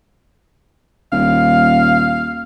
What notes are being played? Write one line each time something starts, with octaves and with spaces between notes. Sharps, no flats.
D#1 F5